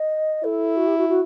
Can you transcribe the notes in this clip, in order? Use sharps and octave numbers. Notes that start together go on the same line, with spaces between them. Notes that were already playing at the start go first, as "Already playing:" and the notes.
Already playing: D#5
E4 A4
F#4
G4
F#4
F#4